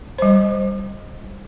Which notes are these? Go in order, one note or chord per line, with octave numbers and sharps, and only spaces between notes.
G3 C5